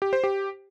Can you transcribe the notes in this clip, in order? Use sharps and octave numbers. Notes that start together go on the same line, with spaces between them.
G4
C5
G4